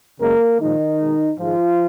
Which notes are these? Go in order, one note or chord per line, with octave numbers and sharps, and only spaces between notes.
F#2 C#3 G#3 A#3 A#4
A#2 D#3 F3 G#3 D#4
B2 G#3
G#2 D#3 F3 G#3 F4